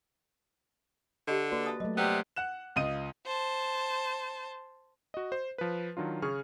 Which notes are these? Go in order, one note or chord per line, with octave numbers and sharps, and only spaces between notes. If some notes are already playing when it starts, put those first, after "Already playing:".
D3 G4 D#5
A#3 F#4 B4 D5
E5 A5 D#6
F#3 A3 D#5
C3 G3 B3
F#5 F#6 E7
C#2 F4 D#5 D#7
C5 A5
F#4 D#5
C5
F3 B4
D#3 F#3 D4 F4
C#3 G#4 C#6 F6